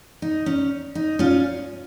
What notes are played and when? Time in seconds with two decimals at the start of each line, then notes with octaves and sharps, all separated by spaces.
0.22 D#4
0.46 C#4
0.95 D#4
1.19 C#4 F4